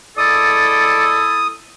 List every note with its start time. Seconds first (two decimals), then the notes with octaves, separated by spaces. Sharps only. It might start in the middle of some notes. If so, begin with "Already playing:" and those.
0.18 G#3 E4 A4 D5 D#6